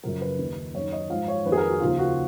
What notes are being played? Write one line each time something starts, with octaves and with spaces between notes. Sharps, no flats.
F#2 C#3 F3 A#4
B4
D#2 D#3
F#2 D#3 C#5
D#5
G#2 F3 F5
C#5
F2 D#3 B4
G#4
A#4
F#4
D#2 C#3 F3 F4
F#4